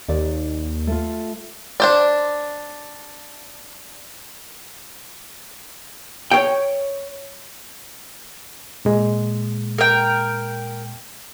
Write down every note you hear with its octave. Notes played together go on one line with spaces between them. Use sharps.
D#2 D5
A3 F4
D4 C5 D5
C#5 G5
A#2 G#3
A#4 G5